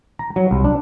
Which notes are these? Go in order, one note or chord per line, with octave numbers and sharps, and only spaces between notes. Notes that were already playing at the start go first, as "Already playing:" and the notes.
A#5
F#3
C2
D4